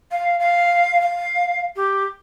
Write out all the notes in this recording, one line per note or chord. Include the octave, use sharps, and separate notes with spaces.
F5
F5
F5
G4